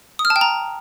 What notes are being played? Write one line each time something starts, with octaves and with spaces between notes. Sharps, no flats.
D#6
F6
A5
G5
A#5